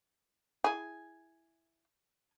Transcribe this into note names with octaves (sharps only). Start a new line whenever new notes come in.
E4 G#4 G#5